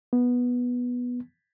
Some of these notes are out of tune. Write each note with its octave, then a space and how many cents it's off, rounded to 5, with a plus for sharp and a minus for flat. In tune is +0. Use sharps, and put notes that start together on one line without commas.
B3 -10